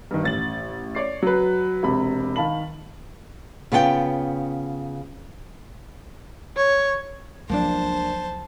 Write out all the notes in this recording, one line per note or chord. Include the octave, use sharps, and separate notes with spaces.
G2 D#3
A1 A6 F#7
C#5 D5 C7
F#3 B4
E1 C3 B5
D#3 F5 A5 B5 F#7
C#3 B3 F4 F#5 G5
C#5
C#2 F3 F#3 A#3 D4 C5 A5